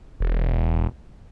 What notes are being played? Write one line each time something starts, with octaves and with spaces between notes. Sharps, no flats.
E1